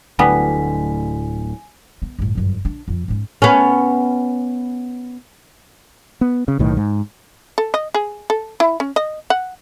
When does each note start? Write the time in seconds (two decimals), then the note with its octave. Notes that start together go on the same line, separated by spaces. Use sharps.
0.19 D1 A2 D3 G3 B3 G#5 B6
2.02 B3
2.19 G1 A2
2.35 G1 F#2
2.65 D4
2.88 F2 C4
3.08 G#2 C#4
3.42 B3 C#4
6.21 B3
6.48 C#3
6.59 B1 A2 D#3
6.77 G#2
7.58 A4
7.74 D#5
7.94 G#4
8.30 A4
8.60 E4
8.80 C#4
8.96 D#5
9.30 F#5